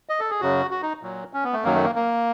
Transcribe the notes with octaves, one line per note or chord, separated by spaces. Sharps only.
D#5
A4
G#4
F#2 C#3 F#3 F#4
F#4
D#4
A#2 F#3
C#4
B3
A3
F#2 D#3 F#3 A#3
A3
A#3
A#3